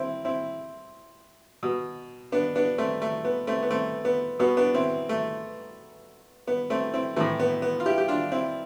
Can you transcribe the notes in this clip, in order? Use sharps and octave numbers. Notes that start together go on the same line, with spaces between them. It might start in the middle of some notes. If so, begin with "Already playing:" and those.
Already playing: C4 E4
C4 E4
B2
B3 D4
B3 D4
A3 C4
A3
B3
A3 C4
B3
A3 C4
B3
B2 B3
B3 D4
C4 E4
A3
B3
A3 C4
C4 E4
A2 E3 A3 C4
B3
B3
F4
E4 G4
G4
D4 F4
C4 E4